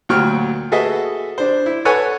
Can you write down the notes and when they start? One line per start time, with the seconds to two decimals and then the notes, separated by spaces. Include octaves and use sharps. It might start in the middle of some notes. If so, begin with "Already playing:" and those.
0.09 D2 A#2 F#3 G5 C#6 F6
0.72 F#4 G#4 A4 B4 D#5 E5
1.38 D4 C5
1.66 E4
1.85 A4 B4 C#5 F#5 G#5